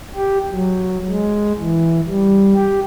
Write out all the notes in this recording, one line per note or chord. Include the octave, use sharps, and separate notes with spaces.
G4
F#3
G#3
E3
G3
G4